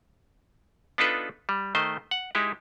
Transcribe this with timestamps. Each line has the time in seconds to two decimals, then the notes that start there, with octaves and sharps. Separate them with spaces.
0.98 B3 D4 D#4 F4 A4 B4
1.49 G3
1.75 D#3 A3 C5 D#5
2.11 F#5
2.35 G#3 D#4 E4 G4